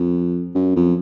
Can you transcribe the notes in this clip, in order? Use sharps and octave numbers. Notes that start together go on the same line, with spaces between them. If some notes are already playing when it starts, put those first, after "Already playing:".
Already playing: F2
F#2
F2